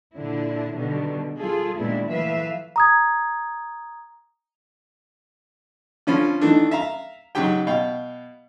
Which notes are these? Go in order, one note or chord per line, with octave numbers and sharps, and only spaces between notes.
A#2 D3 D4 E4
B2 D3 D#3 G3
G3 F4 G#4 A4
A#2 D#3 G#3 B3 D4 E4
E3 F3 A3 B4 E5 F5
A#5 D#6 G#6
D3 F3 C#4 F4 B5
D#3 E3 A3 D4
E5 F5 A#5
G#2 C#3 F#3 G4 G5
B2 F5 G5